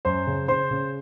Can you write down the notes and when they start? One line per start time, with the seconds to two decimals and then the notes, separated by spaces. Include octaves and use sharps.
0.05 F#2 C5 C6
0.27 C#3
0.48 C#3 C5 C6
0.71 C#3